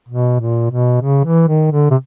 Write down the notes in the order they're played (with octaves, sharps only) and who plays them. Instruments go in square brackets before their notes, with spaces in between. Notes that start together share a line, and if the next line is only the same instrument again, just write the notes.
[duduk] B2
A#2
B2
C#3
E3
D#3
D3
C3